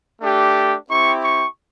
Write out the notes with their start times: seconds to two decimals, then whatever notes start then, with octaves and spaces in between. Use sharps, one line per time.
0.20 A3 D4 G4
0.89 C4 E4 G4 C#6
1.24 C#6